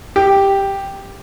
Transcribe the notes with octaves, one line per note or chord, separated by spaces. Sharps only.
G4